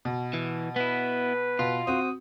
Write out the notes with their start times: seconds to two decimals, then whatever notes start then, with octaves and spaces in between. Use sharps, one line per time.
0.05 B2
0.33 E3
0.76 B3 E4 B4
1.59 B2 F4
1.87 C4 F#4 D#6